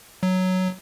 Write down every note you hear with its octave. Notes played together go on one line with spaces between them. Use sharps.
F#3